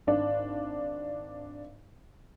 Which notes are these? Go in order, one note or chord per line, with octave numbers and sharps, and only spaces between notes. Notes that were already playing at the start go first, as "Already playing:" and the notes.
G#1 D4